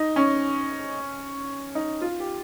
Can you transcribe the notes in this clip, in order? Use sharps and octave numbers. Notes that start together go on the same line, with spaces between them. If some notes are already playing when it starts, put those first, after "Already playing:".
Already playing: D#4
C#4
D#4
F4
G4